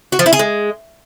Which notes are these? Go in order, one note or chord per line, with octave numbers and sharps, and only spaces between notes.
F#4
F3
E4
G#4
G#3